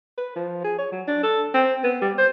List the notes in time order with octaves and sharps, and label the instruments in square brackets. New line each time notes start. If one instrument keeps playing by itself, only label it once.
[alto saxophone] B4
F3
G#4
C#5
F#3
D4
A4
C4
B3
G3
C5